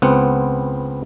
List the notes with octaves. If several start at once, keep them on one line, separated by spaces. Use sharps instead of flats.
C#2 B3 C4 F#5